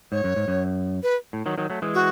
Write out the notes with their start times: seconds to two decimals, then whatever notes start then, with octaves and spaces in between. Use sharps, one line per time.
0.12 G#2 C#5
0.24 F#2
0.36 G#2
0.48 F#2
1.03 B4
1.33 A2
1.46 D#3 F#3
1.58 D#3 F#3
1.70 F#3 A3
1.82 E3 G#3
1.94 F#4